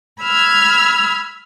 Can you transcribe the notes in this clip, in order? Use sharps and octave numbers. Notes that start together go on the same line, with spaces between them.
B5 E6 F6 G#6